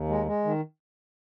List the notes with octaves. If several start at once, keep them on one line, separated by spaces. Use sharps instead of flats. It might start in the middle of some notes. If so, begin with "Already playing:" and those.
Already playing: D#2
G#3
G#3
D#3